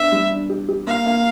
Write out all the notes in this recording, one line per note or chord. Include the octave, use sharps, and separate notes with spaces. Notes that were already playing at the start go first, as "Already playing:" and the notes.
Already playing: B3 D4 E5
G3
D4
G4
G4
A#3 F5
A#3